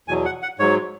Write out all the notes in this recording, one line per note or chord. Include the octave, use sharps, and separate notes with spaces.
E2 B2 F#3 G#5
F#5
F#5
G#2 F#3 C#5